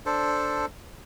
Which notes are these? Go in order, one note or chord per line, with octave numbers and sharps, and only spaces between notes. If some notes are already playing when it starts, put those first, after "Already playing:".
D4 A4 C5